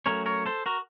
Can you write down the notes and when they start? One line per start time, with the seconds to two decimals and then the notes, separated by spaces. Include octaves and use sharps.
0.06 F#3 A3 C#4 A#4 C#5
0.26 A#4 C#5
0.46 A4 C5
0.66 F#4 A#4